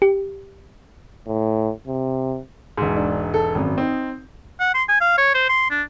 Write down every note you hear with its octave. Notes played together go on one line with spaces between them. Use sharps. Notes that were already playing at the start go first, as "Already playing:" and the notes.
G4
A2
C3
E1 G#2
D4
A4
G#1 F#2
C4 D#4
F#5
C6
G#5
F5
C#5
C5
C6
D4